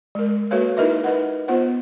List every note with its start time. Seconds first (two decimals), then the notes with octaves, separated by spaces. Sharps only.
0.15 G#3 A#4
0.51 A#3 F#4 A4 B4 C#5 F5
0.77 D#4 E4 A#4 B4 D#5 E5
1.04 B4 D#5 F#5
1.48 B3 F4 C5 F#5